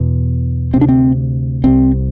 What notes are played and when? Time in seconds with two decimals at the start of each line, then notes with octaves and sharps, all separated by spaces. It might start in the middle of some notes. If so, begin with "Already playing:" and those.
Already playing: E2 B2
0.73 D2 C4
0.76 C3
0.81 D4
0.89 C4
1.64 C2 C3 C4